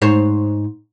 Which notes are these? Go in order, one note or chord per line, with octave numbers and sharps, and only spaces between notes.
G#2 C5 C#5